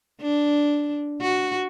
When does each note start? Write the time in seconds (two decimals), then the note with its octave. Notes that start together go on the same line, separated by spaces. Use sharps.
0.21 D4
1.21 F#4